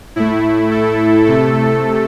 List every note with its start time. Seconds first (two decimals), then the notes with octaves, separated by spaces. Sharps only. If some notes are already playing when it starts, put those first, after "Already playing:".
0.16 A2 A3 E4
0.71 A4
1.26 C3 A3 A4